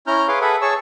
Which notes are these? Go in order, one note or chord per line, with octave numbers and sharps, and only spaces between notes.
C#4 E4 A#5 F6 G6
G#4 B4 C#5 F5 C6 D6
G#4 A4 B4 E5 F#5 B5
G#4 C#5 A5 C#6 E6